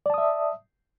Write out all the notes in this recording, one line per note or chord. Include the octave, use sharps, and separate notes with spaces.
D5 E5 A5 D#6